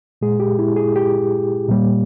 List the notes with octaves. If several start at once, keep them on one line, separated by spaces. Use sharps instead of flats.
A#2 G#3 G#4
G4
E4
G#4
G4
A#2 G3 A#3